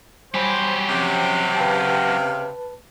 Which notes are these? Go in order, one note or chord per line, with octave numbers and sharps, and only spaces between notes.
F#3 G3 G4 C5 G#5 B5
C3 F3 C4 C#4 F#5 D6
C#3 B4 F5 A5